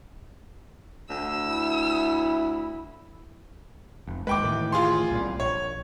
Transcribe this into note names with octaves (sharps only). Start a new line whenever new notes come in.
D2 E6
E4
F1
D#2 G#3 B4 G5 D6
A2 D#3 E3
F4 G#4 C6
C2 A#2 G3
A#1 C#5